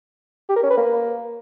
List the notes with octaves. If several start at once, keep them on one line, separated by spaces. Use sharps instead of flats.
G4
A#4
C#4
B4
A#3